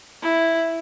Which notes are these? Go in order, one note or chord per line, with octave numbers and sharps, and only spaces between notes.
E4